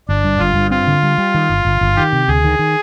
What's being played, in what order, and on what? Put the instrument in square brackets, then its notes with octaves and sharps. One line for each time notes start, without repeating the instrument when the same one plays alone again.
[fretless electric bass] G1 [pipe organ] D4
[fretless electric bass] G2
[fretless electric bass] G1 [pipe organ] F4
[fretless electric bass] G2
[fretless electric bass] C4 [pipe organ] F4
[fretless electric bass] D3
G3
G3
D#3
G1
G1
G1
[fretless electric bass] D#3 [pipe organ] G4
[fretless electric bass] C3
[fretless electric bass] D2 [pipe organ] G#4
[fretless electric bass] D#3
D#3